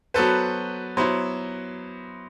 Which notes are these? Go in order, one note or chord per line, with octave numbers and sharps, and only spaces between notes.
F#3 B3 F#4 A4 B4 C5
F#3 B3 E4 C5